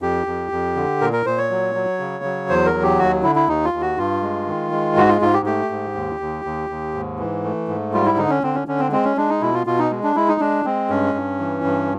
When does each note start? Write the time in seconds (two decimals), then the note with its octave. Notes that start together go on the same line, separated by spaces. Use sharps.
0.02 F2 G4
0.26 F2
0.52 F2
0.76 D3
1.01 A#2 A#4
1.13 A#4
1.26 A#2 C5
1.38 C#5
1.50 F#3
1.75 F#3
1.99 C#3
2.24 F#3
2.49 E2 C5
2.66 A#4
2.74 F#3
2.83 G4
2.98 D#2 F#4
3.23 D3 E4
3.36 E4
3.48 D#2 D#4
3.65 F4
3.73 D#2
3.81 F#4
3.97 G2 F4
4.22 G#3
4.47 D#3
4.72 G#3
4.96 G#2 F#4
5.09 F4
5.21 G#2 F4
5.33 G4
5.46 A3 G4
5.70 G#2
5.95 D#2
6.20 D#2
6.45 D#2
6.70 D#2
6.94 G#2
7.19 E3
7.44 A3
7.68 G#2
7.93 G3 F4
8.06 E4
8.17 D3 D#4
8.30 C#4
8.43 D3 C4
8.55 C#4
8.67 D3 C#4
8.79 C4
8.92 G#3 C4
9.04 C#4
9.17 G#3 D4
9.29 D#4
9.41 B2 E4
9.54 F4
9.66 B2 F4
9.78 D#4
9.91 G#3
10.03 D4
10.16 G#3 E4
10.28 D#4
10.40 G#3 D4
10.65 G#3 C4
10.90 G2 C#4
11.14 G2
11.40 E3
11.64 G2